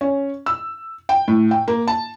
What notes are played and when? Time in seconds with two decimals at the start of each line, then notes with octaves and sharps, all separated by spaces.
0.01 C#4
0.46 E6
1.09 G5
1.28 A2
1.51 G5
1.68 A#3
1.88 A5